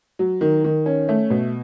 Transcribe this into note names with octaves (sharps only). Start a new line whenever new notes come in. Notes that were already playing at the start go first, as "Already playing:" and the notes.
F#3
D#3
D#3
C#4
A3
B2